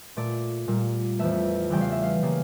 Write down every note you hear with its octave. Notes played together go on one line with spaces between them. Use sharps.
A#2 A3 D5
A#2 G3 A#3
F2 E3 A3 E5
E2 C#3 E3 G3 G5
F5
E5
F5
C#3 G3 A#3